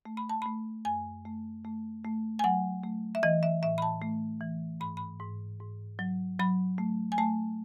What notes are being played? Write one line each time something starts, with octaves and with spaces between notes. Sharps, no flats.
A3
B5
A5
A3 B5
F#2 G#5
A3
A3
A3
G#5
F#3 F#5
A3
E5
E3 D#5
E5
A2 E5
B5
A5
A3
E3
G#2 B5
B5
G#2
G#2
F#3
F#3 B5
A3
G#5
A3 A5